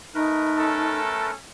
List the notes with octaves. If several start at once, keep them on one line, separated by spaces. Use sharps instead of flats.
A3 D#4 A#4 B4
C#4 A4